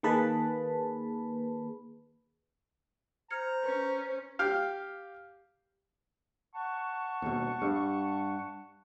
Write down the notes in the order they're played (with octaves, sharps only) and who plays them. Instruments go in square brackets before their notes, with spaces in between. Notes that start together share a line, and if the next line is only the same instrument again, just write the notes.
[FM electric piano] D#3 A#3 G#4 B4 A5 B5
[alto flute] C5 [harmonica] A#5 [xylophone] F6 G#6 C#7
[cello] C#4 [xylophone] B4
[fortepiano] G4 F5
[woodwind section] F#5 A5 C#6
[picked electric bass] D#2 B2
G2